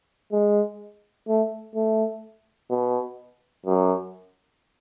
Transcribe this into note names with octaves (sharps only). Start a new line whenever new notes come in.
G#3
A3
A3
B2
F#2